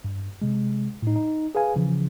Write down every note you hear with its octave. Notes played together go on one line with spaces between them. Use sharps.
G2
C3 G#3
A2 D#4
D#4
G#4 B4 F5 G#5
C#3 E3 F3